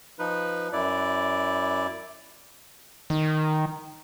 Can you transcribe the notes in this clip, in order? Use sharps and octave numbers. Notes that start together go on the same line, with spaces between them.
F3 D#4 B4
F#2 E4 D5
D#3